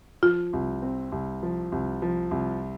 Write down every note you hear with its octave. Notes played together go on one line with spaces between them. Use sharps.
F3 F4
C2
C4
C2
F3
C2
F3
C2